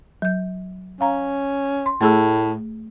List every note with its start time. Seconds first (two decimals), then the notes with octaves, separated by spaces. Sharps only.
0.22 F#3 G6
1.01 C#4 F5 A#5
1.86 C6
2.01 A2 A3 G#4 E6